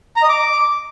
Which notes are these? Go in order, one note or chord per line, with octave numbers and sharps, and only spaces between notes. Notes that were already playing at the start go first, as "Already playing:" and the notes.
A#5
D#5
D6